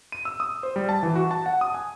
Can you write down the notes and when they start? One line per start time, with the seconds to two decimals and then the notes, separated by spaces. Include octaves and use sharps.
0.12 D#7
0.25 E6
0.40 D#6
0.63 C5
0.76 G3
0.89 A5
1.03 E3
1.16 F#4
1.31 A5
1.46 F#5
1.61 D#6
1.74 G#5